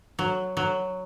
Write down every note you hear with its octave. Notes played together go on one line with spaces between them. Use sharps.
F#3
F#3